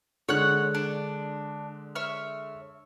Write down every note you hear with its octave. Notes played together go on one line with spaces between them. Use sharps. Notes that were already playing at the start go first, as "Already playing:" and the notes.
D3 G#3 C#5 F#5 F#6
D4
C#5 E5 F6